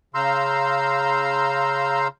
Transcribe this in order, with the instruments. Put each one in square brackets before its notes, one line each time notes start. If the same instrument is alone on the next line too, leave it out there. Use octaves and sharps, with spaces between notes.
[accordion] C#3 F5 A#5 C6 E6 G6